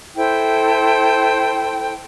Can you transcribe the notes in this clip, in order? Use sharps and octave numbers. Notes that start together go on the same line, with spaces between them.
E4 A4 C5 G5